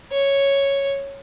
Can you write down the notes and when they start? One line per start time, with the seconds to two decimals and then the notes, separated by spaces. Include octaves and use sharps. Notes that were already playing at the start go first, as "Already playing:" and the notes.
0.12 C#5